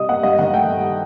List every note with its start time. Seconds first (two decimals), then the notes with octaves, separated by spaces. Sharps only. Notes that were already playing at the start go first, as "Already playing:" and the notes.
Already playing: C3 G3 D#5 D#6
0.09 A#3 F#5
0.23 G2 D#5
0.39 D#3 F#5
0.53 A3 G5
0.68 G2